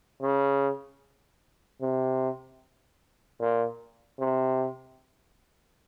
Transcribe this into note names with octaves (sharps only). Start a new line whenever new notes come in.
C#3
C3
A#2
C3